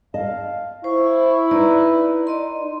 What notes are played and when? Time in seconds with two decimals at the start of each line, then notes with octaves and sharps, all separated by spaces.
0.14 D#5 F5 A5
0.84 E4 C5 C#6
1.51 D#4 B4 D5
2.27 D5 D#5 C6